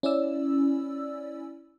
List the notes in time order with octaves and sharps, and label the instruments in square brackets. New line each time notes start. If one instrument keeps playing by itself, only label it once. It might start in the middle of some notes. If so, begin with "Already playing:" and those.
[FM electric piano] C#4 E4 D5 E6